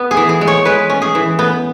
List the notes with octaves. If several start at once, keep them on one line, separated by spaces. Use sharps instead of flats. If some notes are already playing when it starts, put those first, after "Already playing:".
Already playing: B3
G#4
E3
G#4
G#3
C#5
G#3 B4
C#4
G#4
E3
B3